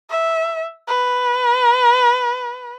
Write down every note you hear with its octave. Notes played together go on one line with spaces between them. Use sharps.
E5
B4